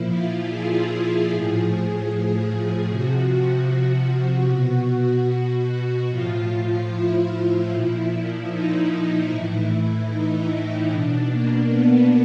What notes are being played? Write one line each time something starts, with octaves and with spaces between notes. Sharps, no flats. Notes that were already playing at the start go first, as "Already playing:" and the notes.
Already playing: A#2 F3 E4
F4
G#4
A2 F3
C3 F3 F#4
B2
A2 F3 F4
E4
A#2 F3
D#4
A2 E3 E4
D#4
B2 D4
A#3
B3